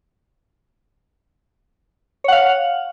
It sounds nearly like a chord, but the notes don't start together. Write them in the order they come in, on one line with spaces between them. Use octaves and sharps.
C#5 F#5 F5